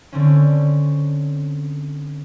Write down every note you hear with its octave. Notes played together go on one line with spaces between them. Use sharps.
D3 C4 C#4